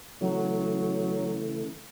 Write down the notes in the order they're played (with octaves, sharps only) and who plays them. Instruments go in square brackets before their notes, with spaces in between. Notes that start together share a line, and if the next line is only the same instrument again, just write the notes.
[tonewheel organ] C#3 E3 A3 [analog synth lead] F#3